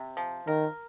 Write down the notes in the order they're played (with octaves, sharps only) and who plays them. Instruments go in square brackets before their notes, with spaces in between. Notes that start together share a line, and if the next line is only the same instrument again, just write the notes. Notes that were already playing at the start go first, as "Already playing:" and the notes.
Already playing: [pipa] C3
F3
[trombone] D#3 [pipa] A#4